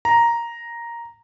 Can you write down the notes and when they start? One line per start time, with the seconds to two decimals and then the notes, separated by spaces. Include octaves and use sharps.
0.05 A#5